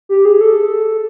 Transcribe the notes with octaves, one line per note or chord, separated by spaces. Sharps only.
G4
G#4
A4